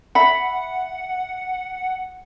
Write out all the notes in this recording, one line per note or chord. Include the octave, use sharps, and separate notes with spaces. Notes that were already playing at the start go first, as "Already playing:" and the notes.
E5 F#5 B5